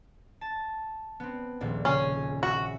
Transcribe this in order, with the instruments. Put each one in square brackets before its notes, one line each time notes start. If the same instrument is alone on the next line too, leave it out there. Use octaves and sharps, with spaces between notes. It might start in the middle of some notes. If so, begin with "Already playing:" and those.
[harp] A5
B3 C4
D#1 A#1
[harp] C#3 G#5 C6 [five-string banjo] C#4
[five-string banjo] F#4 [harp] E5